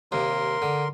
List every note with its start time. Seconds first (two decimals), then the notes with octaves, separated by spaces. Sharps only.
0.12 D#2 C3 A#4 C6
0.62 D3